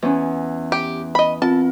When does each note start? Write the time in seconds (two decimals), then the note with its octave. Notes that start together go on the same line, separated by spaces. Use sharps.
0.02 E2 C#4
0.72 G4
1.15 D#5 B5
1.42 C4 F4 A5